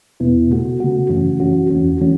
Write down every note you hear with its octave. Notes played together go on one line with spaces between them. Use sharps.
E2 B2 B3 E4
C#3 A3 F#4
C#3 A3 F#4
F#2 E3 C#4 F#4
F#2 E3 C#4 F#4
E2 E3 A3 C#4 F#4
E3 A3 C#4 F#4